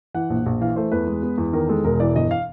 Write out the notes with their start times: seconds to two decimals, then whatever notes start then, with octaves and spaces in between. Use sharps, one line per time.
0.14 E3 F#5
0.30 A#1
0.46 A#1
0.61 E3 F5
0.76 A3 C5
0.92 E2 B4
1.07 G#3
1.23 B3
1.38 E2
1.53 D#3 A#4
1.69 G#3 A4
1.84 E1 A#4
2.00 E3 D5
2.15 G1 D#5
2.31 F5